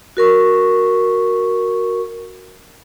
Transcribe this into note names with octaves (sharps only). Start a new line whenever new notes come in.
F#4 A#4 C#6